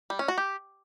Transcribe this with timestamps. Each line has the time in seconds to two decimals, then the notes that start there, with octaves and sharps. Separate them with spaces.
0.10 G3
0.19 C#4
0.28 F#4
0.38 G4